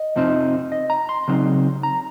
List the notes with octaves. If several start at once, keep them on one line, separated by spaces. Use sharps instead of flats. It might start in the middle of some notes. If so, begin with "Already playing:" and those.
Already playing: D#5
F2 C3 F3 C4 D#4
D#5
A#5
C6
C#3 F#3 C4 D#4
A#5